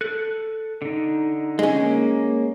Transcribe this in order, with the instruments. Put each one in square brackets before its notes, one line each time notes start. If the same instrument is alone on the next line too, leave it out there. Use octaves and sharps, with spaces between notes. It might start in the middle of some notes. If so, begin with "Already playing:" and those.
[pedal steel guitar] A4 F#6
D3 D#4
[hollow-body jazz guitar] G#3 C#4
[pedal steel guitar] A#3